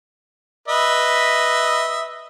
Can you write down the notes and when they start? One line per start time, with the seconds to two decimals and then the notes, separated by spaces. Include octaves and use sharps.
0.68 B4 D#5 E5